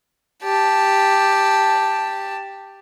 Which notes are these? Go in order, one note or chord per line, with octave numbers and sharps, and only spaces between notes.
G4 A5